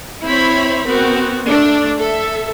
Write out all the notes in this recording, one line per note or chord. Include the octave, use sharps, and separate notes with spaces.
C4 E4 C5 C#5 B5
B3 C4 F#4 A#4
A3 D4 D5
A4 E5